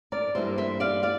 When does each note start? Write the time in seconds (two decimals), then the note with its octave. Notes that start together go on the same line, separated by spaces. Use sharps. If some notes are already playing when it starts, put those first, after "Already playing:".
0.12 A#4 D5
0.35 G2 E3 A#3 C5 E5
0.58 C5 E5
0.80 D5 F5
1.03 D5 F5